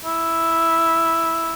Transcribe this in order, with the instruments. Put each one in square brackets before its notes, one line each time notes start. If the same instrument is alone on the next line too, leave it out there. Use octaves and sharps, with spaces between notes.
[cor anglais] E4